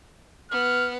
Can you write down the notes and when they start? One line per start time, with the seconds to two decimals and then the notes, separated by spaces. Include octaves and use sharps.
0.51 B3 F6